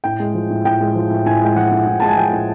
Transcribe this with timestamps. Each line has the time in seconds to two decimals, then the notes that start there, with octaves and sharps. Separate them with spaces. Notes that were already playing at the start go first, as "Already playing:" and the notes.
0.04 A2 G5
0.20 G#3
0.35 F3
0.50 A2
0.65 A2 G5
0.81 G#3
0.95 F3
1.10 A2
1.26 A2 G#5
1.41 G#3 G5
1.56 F3 F#5
1.72 A2
1.87 A2
2.00 G#3 A5
2.08 G#5
2.17 F3 G5
2.33 A2